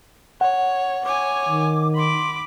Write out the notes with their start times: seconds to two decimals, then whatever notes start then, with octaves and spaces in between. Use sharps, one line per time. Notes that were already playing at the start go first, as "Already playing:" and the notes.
0.41 C#5 F#5
1.05 C#5 G#5 D6
1.49 D#3
1.96 B5 C6 D6